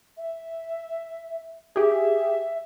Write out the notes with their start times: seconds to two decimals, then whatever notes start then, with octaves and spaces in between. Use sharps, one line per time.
0.17 E5
1.76 G4 G#4 E5